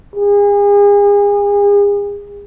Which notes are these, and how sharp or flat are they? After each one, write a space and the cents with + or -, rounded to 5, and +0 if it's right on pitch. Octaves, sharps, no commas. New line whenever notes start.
G#4 -35